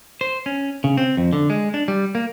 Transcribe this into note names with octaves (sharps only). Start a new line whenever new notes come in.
C5
C#4
C#3
C4
F2
D3
G#3
D4
G3
A#3